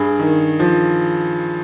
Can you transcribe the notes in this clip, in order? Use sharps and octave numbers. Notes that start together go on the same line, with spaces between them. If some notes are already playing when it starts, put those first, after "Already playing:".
Already playing: G2 G#4
D#3
F3